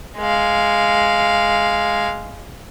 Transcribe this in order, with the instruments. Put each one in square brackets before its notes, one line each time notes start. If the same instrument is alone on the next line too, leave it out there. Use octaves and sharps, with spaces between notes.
[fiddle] G#3 F5